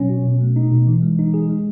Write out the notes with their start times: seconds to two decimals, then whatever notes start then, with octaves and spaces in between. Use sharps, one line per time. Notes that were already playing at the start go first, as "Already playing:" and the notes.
Already playing: B2 F#3 C#4
0.09 F#4
0.25 B2
0.41 A3
0.56 D#4
0.72 B2
0.87 E3
1.03 G#3
1.19 D#4
1.34 G#4
1.49 G#3